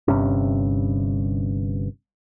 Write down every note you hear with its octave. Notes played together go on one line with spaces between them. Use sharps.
G1 G2 C3 C#4